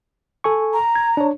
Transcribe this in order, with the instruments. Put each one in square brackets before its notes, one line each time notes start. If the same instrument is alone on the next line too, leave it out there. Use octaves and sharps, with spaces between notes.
[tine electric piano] A4 G#5 C#6
[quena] A#5
[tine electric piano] G#6
D4 C#5